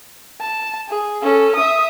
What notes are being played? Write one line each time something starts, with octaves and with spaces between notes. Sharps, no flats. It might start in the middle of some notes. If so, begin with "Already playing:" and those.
A5
G#4
C#4 A4
E5 D#6